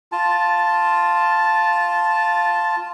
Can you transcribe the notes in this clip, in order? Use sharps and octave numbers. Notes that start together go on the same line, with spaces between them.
F4 A5